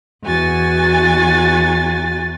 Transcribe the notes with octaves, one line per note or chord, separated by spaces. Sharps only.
E2 F#4 G#5 A6